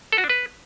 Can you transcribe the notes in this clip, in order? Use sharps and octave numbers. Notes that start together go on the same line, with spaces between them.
A4
F#4
D4
B4